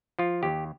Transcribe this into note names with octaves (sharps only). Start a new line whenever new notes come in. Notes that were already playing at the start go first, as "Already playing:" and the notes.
F3 F4
D#2 G4